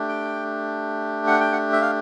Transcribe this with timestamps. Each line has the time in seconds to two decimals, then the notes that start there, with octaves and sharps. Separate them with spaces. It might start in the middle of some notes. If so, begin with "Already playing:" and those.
Already playing: A3 D4 G4
0.08 G5
1.27 F#5
1.40 G5
1.52 F#5
1.73 E5
1.82 F5